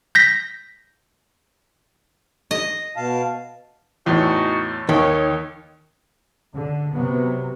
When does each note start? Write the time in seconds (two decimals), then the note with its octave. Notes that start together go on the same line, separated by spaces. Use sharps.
0.15 G6 A#6 B6
2.51 D#5
2.97 B2 F5 A5
4.06 E2 A2 D#4 F#4
4.89 D#2 D#3 C#5
6.54 D3
6.95 C3 F#3 B3